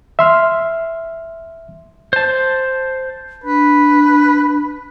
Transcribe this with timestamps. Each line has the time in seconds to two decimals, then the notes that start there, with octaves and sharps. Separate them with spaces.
0.19 E5 C6 F6
2.13 C5 A5
3.44 D4 B4